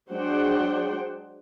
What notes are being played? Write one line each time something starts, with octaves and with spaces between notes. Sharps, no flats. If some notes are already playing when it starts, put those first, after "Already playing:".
F#3 G#3 D4 C5 F#5 G5